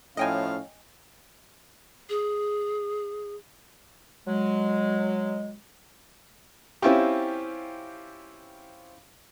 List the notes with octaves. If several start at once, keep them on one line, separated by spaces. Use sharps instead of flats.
A2 F3 C#4 D#5 F5 G5 G#5
G#4
F#3 G#3
C4 C#4 E4 F4 G4